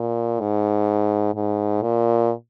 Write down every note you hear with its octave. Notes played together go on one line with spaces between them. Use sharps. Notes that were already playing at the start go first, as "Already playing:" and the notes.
Already playing: A#2
G#2
G#2
A#2